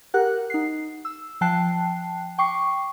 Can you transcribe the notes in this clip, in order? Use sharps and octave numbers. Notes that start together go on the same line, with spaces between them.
G4 A#4 F#5 F#6
D#4 C7
E6
F3 G5 A5 F#6 C7
G5 C#6 D6 C7